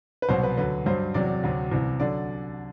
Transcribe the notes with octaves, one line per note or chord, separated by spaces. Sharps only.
B4
C2 B2 F#3 C5
B4
D2 D3 F#3 B4
G2 F#3 C5
E2 C3 F#3 D5
D2 C3 F#3
C2 C3 E3
D3 F#3 D5